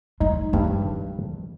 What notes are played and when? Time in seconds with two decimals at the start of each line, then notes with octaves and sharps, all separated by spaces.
0.20 G#3 D#4
0.53 G2 G#3